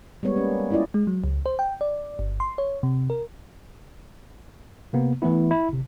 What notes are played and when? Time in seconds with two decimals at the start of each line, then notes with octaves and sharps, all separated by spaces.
0.23 G3 G#3 B3 C#5
0.36 A#3 C#4
0.70 C#4 E4 F4 D5 D#5
0.94 G#3
1.07 F#3
1.24 C#2
1.46 C5
1.59 G5
1.81 D5
2.19 G1
2.40 C6
2.58 C#5
2.83 C3
3.10 A#4
4.93 C3 A#3 B3
5.22 E3 A3 B3 E4
5.51 E4
5.69 G1 C3